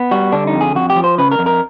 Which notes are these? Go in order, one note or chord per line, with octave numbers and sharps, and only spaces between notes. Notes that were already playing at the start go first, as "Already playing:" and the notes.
Already playing: B3
G3 F#4
D3 D4
D#4
F2
G#4
F2 F#4
G4
F3
C5
C#3 B4
A#4
F2
A#4